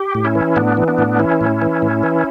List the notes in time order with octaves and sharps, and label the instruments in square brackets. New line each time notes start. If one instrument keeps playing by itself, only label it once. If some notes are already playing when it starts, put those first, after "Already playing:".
Already playing: [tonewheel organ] G4
A2
C#4 E4
E3
A2 B3 D4
E3
B3 D4
A2
E3 C#4 E4
A2
E3
A2
E3